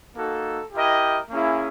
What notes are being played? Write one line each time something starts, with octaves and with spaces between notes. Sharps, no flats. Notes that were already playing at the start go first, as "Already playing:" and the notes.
A#3 D#4 F#4 A4
E4 G4 A#4 D#5 G5
A#3 C#4 E4 G#4